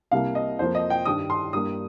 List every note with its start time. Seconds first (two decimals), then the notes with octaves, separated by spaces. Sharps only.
0.11 C2 C3 G3 A#3 F5
0.35 D#5
0.59 F2 F3 A#3 C5
0.75 D#5
0.90 G5
1.05 G2 D#3 G3 D#6
1.30 C6
1.53 G2 G3 A#3 D#6